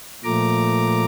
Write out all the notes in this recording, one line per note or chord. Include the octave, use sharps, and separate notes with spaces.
A#2 F3 A3 A#5 D6